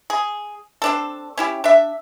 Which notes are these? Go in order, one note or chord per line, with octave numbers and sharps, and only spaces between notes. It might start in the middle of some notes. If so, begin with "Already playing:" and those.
G#4
C4 D4 A4
C#4 E4 G4
D4 E5